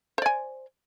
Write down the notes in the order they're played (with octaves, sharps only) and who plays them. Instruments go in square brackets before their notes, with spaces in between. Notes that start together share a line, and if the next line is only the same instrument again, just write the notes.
[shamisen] C5
D5
G#5